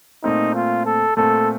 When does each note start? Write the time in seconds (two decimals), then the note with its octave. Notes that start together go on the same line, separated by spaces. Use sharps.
0.24 A#2 A3 C4 D#4
0.55 F4
0.86 A4
1.17 A#2 A3 C4 A4